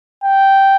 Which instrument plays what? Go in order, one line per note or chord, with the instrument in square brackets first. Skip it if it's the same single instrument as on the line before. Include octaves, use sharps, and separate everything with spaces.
[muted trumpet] G5